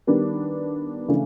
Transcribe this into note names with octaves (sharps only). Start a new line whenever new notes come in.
D#3 G3 B3 D4
C#3 E3 A3 D4